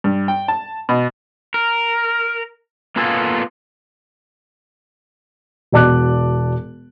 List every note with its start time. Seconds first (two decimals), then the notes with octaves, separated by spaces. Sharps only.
0.04 G2
0.28 G5
0.48 A5
0.89 B2
1.54 A#4
2.96 A#3 B3 F4 A4 G#5
5.72 E1 F#4 D5 A5 D6 F#6